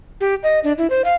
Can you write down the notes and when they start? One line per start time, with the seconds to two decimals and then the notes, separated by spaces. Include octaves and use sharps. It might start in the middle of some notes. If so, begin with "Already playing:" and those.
0.21 G4
0.43 D#5
0.64 D4
0.78 E4
0.90 C5
1.05 F5